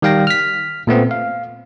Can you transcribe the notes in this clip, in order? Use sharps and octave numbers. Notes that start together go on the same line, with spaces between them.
D#3 G3 F5 G5 A#6
F6 B6
A#2 A3 B3 C4
F5